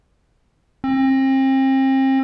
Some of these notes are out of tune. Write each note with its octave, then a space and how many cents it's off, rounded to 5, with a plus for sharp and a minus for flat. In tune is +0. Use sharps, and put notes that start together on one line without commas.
C4 +35